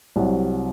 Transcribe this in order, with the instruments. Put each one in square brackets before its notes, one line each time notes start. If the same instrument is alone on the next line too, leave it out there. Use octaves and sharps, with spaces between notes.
[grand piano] C2 C3 F#3